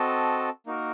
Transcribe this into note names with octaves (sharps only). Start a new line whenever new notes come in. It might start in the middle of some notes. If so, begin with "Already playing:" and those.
Already playing: C4 F#4 A4 D#5 A5
A#3 D#4 F#4 A#4